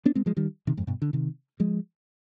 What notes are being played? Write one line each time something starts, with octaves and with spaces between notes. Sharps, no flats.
B3 D4
G#3 C4
F3 G#3
D#3 G3
C3 D#3
F2 G#2
G2 B2
D3
C3 D#3
F3 G#3